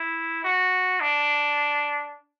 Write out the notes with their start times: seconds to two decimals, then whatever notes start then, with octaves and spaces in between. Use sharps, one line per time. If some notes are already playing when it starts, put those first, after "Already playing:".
Already playing: E4
0.45 F#4
1.01 D4